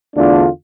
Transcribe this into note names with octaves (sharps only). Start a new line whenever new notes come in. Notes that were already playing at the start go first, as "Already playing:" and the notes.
E2 D3 A3 D4 F4